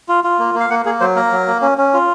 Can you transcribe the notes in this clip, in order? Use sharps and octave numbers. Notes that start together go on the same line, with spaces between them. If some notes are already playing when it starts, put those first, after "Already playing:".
F4
F4
A#3
A#3
F5
A#3 F#5
A#3 G#4
F#3 C5
A#3 A#4
F#3
A#3
C#4
C#4
F4